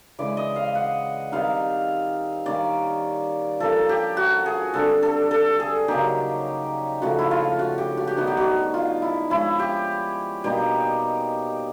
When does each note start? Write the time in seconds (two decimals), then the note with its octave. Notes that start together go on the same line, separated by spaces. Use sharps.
0.19 C#3 E3 G#3 D5
0.37 D#5
0.56 F5
0.75 F#5
1.32 D#3 G3 C4 D#4 F5
2.46 D#3 G3 A#3 C#4 D5
3.60 F3 A#3 C#4 A4
3.89 G4
4.17 F#4
4.46 G#4
4.74 D3 G3 C4 A4
5.03 A4
5.31 A4
5.60 G#4
5.88 C#3 F#3 A#3 D#4 G4
7.02 C#3 F3 A3 F#4
7.19 E4
7.31 F4
7.59 F#4
7.78 G4
7.97 F#4
8.07 G4
8.16 D#3 G3 B3 D#4 F#4
8.27 G4
8.37 F#4
8.74 F4
9.02 E4
9.30 F3 G#3 C#4 E4
9.59 G4
10.44 B2 G3 A#3 D#4 G4